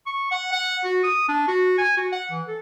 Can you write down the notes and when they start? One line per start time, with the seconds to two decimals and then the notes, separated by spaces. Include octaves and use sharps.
0.06 C#6
0.31 F#5
0.52 F#5
0.84 F#4
1.04 D#6
1.29 D4
1.48 F#4
1.78 G#5
1.97 F#4
2.12 F#5
2.31 E3
2.48 A4